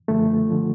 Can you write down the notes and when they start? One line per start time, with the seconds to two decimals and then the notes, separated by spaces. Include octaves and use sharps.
0.08 F#2 D3 F3 A3
0.50 D3 F3